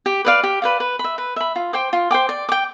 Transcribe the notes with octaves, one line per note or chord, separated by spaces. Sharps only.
G4
B4 D5 F5
G4
B4 D5 F5
B4
B5
E5
B4
E5 B5
F4
C5 G5 D6
F4
C5 G5 D6
D5
G5 D6